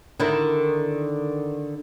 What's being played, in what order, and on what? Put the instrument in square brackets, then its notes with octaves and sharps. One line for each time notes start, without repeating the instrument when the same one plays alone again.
[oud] D3 D#3 E4